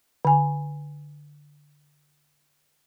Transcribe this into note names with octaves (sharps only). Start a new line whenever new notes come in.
D3 G#5